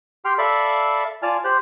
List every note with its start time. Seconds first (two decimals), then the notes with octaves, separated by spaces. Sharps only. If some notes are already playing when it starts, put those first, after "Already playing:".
0.25 G4 G5 C6 F6
0.38 A4 D5 E5 F5 B5
1.23 F4 D5 G#5 A5 F6
1.44 G4 C5 F#6